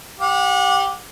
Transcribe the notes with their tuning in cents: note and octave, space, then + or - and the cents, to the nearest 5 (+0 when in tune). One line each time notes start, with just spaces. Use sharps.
G4 +0 F#5 -35